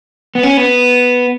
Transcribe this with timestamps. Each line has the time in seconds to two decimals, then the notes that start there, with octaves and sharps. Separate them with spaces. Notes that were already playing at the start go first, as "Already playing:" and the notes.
0.35 B3
0.43 C#4
0.57 B3